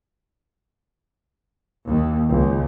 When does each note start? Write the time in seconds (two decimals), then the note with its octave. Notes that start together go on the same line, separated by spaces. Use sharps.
1.87 D#2
2.30 C#2